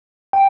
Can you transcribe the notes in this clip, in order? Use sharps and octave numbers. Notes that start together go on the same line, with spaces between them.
G5